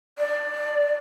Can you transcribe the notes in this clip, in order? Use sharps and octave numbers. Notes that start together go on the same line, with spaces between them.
D5